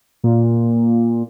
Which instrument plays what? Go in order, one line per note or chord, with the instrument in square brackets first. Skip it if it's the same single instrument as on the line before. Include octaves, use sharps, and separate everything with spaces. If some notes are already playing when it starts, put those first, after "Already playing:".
[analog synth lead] A#2